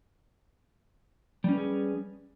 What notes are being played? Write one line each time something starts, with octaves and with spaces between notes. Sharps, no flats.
G3 C#4 G#4 B4